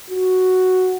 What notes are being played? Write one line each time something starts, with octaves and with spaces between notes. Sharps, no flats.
F#4